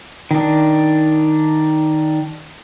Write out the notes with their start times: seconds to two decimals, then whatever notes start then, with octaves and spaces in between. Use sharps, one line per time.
0.31 D#3 D4